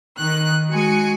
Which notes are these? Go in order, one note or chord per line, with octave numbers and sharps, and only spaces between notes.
D#3 F#6
G#3 F#4 G#5 C#7